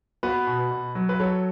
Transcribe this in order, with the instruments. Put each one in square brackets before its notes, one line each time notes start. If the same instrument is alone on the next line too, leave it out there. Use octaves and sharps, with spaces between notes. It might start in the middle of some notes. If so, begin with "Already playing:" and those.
[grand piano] B3 F#4 B4
B2
B2
F#3
B4
F#3 A4 C#5